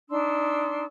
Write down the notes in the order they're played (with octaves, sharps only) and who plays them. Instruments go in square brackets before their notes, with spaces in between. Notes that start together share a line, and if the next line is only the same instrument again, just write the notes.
[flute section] D4 D#4 C6 E6